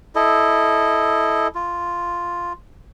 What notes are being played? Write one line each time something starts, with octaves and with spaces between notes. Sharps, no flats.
E4 A4 D#5
F4